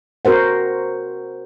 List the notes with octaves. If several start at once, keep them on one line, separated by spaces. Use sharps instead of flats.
C4 F#4 A#4 C5 F#5